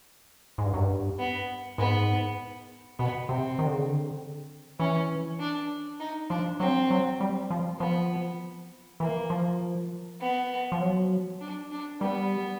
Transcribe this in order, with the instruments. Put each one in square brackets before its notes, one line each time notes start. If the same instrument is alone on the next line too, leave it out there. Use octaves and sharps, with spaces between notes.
[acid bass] G#2
G2
F#2
G2
[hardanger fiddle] B3
[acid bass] G#2 [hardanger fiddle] B3
[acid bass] B2 [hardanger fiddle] B3
[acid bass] C3 [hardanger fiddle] C4
[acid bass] D#3
D3
C#3
D3
[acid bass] E3 [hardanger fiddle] C#4
[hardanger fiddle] D4
D#4
[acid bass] F3 [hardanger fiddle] D4
[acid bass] F#3 [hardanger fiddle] C4
[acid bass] F#3
G3
F3
[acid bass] F3 [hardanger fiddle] B3
[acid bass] E3 [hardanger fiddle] A#3
[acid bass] F3
[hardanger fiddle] B3
[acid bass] F3
F#3
[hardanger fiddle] D4
D4
[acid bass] G3 [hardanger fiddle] B3